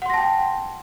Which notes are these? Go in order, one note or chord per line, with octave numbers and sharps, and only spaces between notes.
F#5 G5 A5 C6 A#6